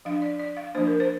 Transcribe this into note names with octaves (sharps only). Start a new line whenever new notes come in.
F3 D4 F5
D5
D5
F5
F3 A#3 D4 C5
A#4
C5